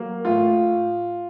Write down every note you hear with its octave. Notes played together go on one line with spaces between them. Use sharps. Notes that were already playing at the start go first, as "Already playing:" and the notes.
Already playing: F#3 A#3
A2 F4